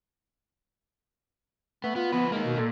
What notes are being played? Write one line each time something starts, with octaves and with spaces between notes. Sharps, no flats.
A3 B3
B3 F4
F3 B3 B4
G#3 A#3 D#4
B2
A#2 A4